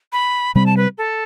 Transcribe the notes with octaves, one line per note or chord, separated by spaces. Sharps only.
B5
C3 G3 C4 B5
A5
B4
A4